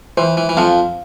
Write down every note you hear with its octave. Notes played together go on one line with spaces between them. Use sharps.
E3 C5
E3
E3
F2 F3 F5